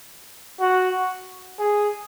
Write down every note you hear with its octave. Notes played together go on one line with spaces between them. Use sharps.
F#4
G#4